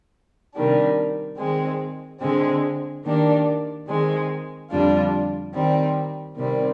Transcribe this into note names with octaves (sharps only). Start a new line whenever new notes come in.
C3 D#3 G3 D4
D#3 G#3 C4
D3 G#3 C4
D#3 A#3 D4 G4
D#3 G#3 C4
F2 D3 G3 D4 F4
D#3 G3 C4
C3 D#3 G3 C4